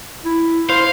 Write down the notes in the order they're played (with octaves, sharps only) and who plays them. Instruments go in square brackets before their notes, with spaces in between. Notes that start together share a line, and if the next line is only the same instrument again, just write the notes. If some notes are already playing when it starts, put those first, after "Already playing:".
[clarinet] E4
[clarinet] E4 [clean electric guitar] C5 [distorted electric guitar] F5